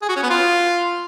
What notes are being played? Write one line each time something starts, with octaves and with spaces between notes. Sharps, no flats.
G#4
F#4
C#4
B3
F4